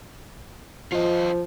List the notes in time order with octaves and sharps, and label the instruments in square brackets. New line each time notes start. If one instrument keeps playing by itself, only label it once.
[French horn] F3 [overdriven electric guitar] F4 D#5